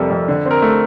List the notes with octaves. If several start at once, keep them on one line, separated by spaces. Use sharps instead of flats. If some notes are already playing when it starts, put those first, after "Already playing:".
Already playing: F2 C3 G3 A4 A#4
F2
D3
C4 A#4
A3